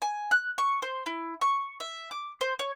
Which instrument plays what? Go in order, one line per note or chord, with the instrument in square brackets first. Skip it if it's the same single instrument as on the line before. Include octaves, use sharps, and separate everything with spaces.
[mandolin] G#5
F#6
C#6
C5
E4
C#6
E5
D6
C5
C#5